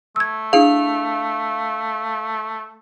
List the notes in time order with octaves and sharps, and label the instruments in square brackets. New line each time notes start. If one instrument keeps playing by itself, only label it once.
[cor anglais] A3 [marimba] E6 G#6
[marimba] D4 E4 G#4 [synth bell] F5